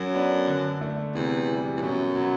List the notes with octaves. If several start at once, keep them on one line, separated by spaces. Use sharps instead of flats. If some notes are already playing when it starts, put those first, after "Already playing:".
Already playing: F#2 F#3
B3 D4
D3
A3 D4
E2 C3
E3 G3
E2
F#2 B2
F#3 B3